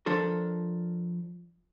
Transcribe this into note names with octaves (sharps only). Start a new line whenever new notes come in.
F3 D4 A4 A#4